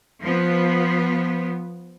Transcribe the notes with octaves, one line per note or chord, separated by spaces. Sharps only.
F3 B3